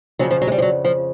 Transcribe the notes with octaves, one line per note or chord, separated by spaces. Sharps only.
F2 C#3 F3 F#3
F3
F#3
G#3
G3
F3
F#3
F3